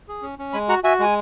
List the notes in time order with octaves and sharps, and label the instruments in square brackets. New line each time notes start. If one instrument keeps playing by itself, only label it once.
[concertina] G#4
C#4
C#4
G#3 G#5 B5
F#4 F#5 A#5
F#4 E5 G#5
G#3 G#5